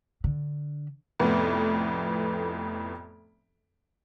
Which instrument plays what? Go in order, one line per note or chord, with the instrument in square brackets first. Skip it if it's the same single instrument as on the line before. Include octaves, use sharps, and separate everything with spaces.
[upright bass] D3
[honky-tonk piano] F1 F2 A2 B3